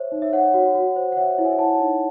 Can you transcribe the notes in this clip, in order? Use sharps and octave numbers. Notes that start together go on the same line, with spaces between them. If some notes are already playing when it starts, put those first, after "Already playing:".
Already playing: C5 C#5 E5
D#4
E5
C#5 F#5
F#4
F#4
C5
F#5
C#5 E5
F#5
E4
E5 G#5
C#5 F#5 A5
D#4